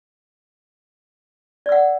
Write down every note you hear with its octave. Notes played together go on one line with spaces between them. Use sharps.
D5 F#5 E6